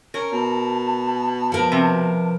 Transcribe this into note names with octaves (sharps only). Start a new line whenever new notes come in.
C#4 A#4
B2 A5
F3 A#4 B4
C3